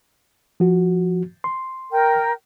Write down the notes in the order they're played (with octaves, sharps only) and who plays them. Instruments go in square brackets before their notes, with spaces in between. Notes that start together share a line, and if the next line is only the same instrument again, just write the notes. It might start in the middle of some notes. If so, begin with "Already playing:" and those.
[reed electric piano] F3 F#4
C6
[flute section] A#4 G5